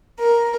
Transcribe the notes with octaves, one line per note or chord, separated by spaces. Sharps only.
A#4